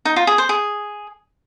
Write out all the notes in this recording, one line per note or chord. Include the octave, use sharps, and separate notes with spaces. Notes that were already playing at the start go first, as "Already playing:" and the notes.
D#4
F4
G#4
C5
G#4